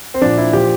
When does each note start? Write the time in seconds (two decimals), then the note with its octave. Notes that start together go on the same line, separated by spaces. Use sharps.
0.14 C4
0.21 A#2 F3 D4
0.37 E4
0.53 A#2 F3 G4